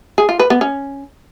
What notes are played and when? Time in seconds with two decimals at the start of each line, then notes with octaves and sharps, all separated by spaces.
0.18 G#4
0.29 F4
0.40 B4
0.50 B3
0.61 C#4